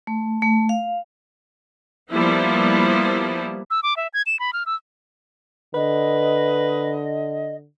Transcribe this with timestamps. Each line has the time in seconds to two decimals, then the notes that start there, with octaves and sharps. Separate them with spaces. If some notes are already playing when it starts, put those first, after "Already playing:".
0.07 A3
0.42 A3
0.69 F5
2.11 F3 G3 A#3 B3 E4
3.71 E6
3.83 D6
3.97 E5
4.14 G#6
4.26 E7
4.40 B5
4.53 F6
4.66 E6
5.75 D3 B4 D#5